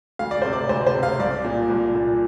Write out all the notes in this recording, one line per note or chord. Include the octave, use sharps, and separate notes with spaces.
D2 F5
D5
C3 C5
D5
D2 C5
C5
C3
F5
C2 D5
A#2
C2
A#2